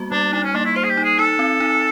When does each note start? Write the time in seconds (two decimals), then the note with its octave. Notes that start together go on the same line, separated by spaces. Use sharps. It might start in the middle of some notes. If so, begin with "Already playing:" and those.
Already playing: G3 A#3 B3 F#4
0.11 G3 D4
0.33 D4 D#4
0.43 C#4
0.54 A#3 D4
0.65 E4
0.76 F4 C5
0.84 G#4
0.90 G4
0.97 D#4
1.04 G#4
1.18 D#4 A4
1.39 C4
1.60 D#4